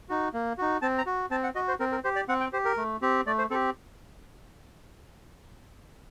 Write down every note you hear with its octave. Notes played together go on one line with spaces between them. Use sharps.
D#4 F#4
A#3
D#4 F#4
C4 A5
A#5
F#4
C4 A5
F#5
F#4 D#5
C5
C4 A#4
A#4
G4 C5
D5
C4 F#5
G5
G4 C5
A#4
A3
C4 G4
A3 D5
C5
C4 G4 A4